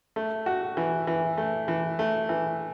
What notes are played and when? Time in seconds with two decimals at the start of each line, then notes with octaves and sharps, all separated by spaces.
0.16 A3
0.46 F#4
0.77 E3
1.07 E3
1.37 A3
1.68 E3
1.99 A3
2.29 E3